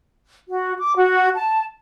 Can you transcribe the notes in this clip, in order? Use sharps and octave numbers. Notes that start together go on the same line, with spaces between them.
F#4
D6
F#4
A5